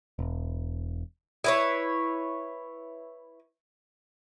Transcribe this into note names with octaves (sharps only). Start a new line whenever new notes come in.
E1
E4 B4 C#5